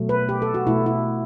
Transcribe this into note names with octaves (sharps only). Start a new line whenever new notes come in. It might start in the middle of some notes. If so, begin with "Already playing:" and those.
Already playing: B2 F#3 A3
B4
G4
A4
F#4
B2 A3 E4
E4